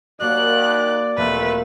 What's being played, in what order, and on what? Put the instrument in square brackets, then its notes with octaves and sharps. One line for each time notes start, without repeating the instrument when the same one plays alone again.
[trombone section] D#2 [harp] A#3 F#4 [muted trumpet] D5 [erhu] F#6
[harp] E1 A#3 [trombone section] F2 C3 A3 [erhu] B4